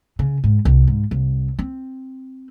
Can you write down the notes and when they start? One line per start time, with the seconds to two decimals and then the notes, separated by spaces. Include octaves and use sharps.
0.19 C#3
0.44 G#2
0.65 C2
0.87 G#2
1.11 C2
1.59 C4